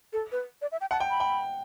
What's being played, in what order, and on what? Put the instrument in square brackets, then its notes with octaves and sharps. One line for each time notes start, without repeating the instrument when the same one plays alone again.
[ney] A4
B4
D5
E5
G5
[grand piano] F#5 [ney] A5
[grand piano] G5
[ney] B5
[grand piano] G5